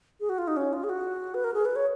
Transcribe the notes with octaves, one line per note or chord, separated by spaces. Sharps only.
G#4
F#4
F4
D#4
C#4
F4
G#4
F#4
B4
A#4
G#4
B4
C#5